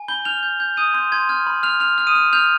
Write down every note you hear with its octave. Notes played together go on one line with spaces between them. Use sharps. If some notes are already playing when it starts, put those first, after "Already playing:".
Already playing: G#5
B5 G6 G7
F6 G6 F7
G6
G6
D#6 G6 D#7
C6 G6
C6 G#6
F6 G#6
B5
F6 F7
F6 F7
F6
D#6 D#7
F6
F6 G6 F7